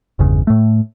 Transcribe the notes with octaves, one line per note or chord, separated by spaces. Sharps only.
G1 E2 C#3
A2 A3